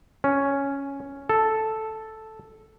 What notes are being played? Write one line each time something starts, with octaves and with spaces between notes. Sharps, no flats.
C#4
A4